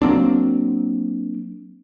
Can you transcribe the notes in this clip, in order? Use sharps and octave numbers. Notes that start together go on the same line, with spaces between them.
F#3 A#3 C4 D4